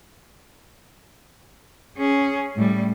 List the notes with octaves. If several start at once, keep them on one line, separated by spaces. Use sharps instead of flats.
C#4 G#4
A2 G3